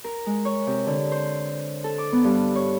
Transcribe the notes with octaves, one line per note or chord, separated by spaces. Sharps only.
A#4
G#3
C#5
C3
D3
C5
A4
D6
B3
G2
C#5